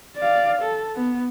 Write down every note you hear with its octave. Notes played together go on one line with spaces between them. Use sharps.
D5 F5
A4
B3